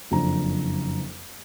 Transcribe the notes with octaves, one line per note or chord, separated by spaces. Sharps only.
F#1 F2 D4 A#5